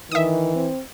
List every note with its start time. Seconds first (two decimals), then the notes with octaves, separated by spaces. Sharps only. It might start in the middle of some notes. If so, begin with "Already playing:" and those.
0.11 D#3 E3 E5 D#6
0.55 C4